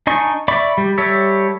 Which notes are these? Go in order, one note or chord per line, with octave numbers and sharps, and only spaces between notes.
D4 D#4 D#5 G#5 C#6
D5 E5 B5 C#6 D6
G3
G3 A4 C#5 E5